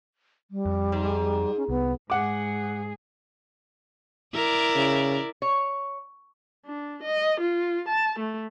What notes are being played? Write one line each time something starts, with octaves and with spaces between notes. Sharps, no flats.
G3
F2
G#2
C#4
C2 B3
G#2 G#4 F#5 D6
E4 A#4 D5
C#3
C#5
D4
D#5
F4
A5
A3